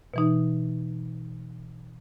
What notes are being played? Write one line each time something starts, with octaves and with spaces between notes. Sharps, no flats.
B2 E3 D#4